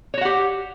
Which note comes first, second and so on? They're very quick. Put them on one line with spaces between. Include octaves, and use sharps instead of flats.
C#5 F#4 F#5 G4